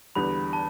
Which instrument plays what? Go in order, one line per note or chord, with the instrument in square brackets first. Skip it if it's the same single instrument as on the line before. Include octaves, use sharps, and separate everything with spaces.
[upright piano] E2 D3 G3 B3 [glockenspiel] B5
[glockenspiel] A5